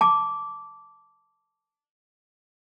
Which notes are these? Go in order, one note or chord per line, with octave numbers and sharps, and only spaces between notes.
A5 D6